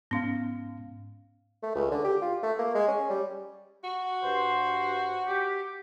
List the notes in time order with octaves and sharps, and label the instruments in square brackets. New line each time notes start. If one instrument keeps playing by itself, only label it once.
[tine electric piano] G#2 F5 [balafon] B3 C#4
[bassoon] A3
C#2
D3
G4
F4
A3
A#3
G#3
C#4
G3
[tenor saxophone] F#4
[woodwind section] G2 C5
G4